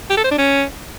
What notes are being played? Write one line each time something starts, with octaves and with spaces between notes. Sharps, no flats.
G4
A4
C5
D4
C#4